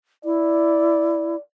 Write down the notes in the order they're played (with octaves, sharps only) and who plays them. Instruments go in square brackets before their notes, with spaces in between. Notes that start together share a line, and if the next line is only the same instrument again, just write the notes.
[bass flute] E4 [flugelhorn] D5